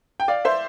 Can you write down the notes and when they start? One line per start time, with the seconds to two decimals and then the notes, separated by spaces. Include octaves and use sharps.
0.20 G5
0.28 D5 F5
0.45 C5 E5